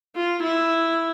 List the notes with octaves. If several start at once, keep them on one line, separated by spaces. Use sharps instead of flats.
F4
E4